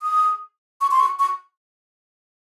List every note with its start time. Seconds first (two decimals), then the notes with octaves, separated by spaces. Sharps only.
0.02 D#6
0.81 C#6
0.91 C6
1.00 C#6
1.19 C#6